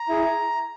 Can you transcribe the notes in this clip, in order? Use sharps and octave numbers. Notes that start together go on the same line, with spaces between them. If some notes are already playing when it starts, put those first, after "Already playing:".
Already playing: A#5
E4 G#4